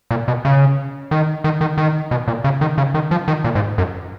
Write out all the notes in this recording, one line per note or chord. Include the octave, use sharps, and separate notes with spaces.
A#2
B2
C#3
D#3
D#3
D#3
D#3
B2
A#2
C#3
D#3
C#3
D#3
F3
D#3
A#2
G#2
F#2